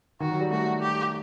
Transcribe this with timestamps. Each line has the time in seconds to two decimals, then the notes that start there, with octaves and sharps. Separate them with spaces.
0.20 D#3 F#4
0.31 F#3
0.40 G3
0.50 A3 F#4
0.81 G4